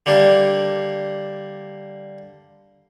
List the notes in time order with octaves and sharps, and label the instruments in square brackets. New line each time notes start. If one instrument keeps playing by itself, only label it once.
[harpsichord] D3 G3 A#3 D4